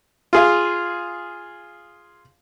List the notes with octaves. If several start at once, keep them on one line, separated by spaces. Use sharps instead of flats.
F4 G#4 F5